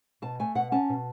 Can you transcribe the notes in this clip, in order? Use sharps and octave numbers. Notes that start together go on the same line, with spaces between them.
B2 A5
A3 G#5
B2 F#5
C#4 A5
B2